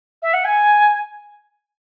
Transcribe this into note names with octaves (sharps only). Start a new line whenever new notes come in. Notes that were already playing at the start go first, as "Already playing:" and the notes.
E5
F#5
G#5